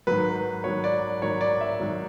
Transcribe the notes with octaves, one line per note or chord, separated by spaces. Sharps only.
G#2 D#3 F#3 B4
G#2 D#3 F#3 C#5
D5
G#2 D#3 F#3 C#5
D5
E5
G#2 D#3 F#3